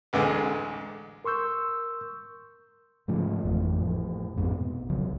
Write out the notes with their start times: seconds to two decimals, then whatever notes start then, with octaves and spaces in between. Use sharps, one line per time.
0.13 A1 D2 D3 G#3
1.24 A#4 C6 C#6 E6 G6
3.08 G#2 C#3 F3 A3
3.44 G#1 F2 E3 A3
3.80 A2 F3
4.36 A1 F2 G#2 B3
4.59 B2
4.89 C#2 C#3 F3 F#3